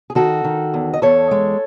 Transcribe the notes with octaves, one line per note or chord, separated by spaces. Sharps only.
G#4
D#3 F#4 A4
D#3
E2
D#5
E2 A4 C#5
G#3